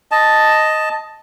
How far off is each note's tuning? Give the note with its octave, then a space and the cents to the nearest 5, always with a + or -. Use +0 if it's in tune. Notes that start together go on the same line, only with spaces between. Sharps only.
D#5 +0 A5 +0